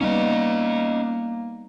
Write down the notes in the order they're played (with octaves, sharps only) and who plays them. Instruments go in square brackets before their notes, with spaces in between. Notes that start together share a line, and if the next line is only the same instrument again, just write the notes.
[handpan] G3 B3 D#4 [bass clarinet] A#3 [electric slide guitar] C#4 D#5